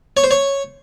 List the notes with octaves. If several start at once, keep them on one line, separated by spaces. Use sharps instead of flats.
C#5
C5
C#5